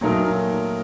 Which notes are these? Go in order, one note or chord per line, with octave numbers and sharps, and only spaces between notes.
A#2 F#3 A3 D#4 A#4